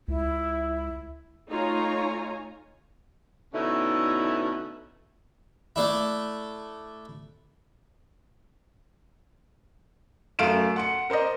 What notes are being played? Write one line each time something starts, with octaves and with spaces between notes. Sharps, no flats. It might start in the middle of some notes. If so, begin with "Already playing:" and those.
C#2 E4
A3 D#4 F4 C#5 G#5 A#5
B2 D3 A3 C#4 D#4 E4
A3 D4 E4
F#2 A3 F5 D7 E7
F#5 C6 C#7
A#4 C5 D5 D#5